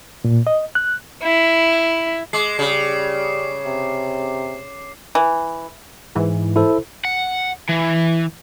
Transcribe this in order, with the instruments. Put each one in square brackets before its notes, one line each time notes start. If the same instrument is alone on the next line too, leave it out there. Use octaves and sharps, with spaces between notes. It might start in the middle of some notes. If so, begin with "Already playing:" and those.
[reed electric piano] A#2
D#5
F#6
[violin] E4
[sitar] G#3 [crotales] D6 C7
[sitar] C#3 [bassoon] G3
[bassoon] C3
[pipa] E3
[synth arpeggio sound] G#2 E3
[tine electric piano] E4 A4 C5
[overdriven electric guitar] F#5
E3